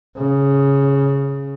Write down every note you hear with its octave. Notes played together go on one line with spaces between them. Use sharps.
C#3